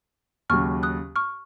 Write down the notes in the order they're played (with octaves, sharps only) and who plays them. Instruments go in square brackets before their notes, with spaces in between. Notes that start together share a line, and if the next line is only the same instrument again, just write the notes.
[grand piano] D#2 C#3 F#3 [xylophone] C#6 F6
[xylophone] D#6 F#6
C#6 F6